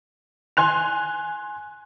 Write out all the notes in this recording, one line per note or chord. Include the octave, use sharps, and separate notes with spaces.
G#5 C6 F#6 F7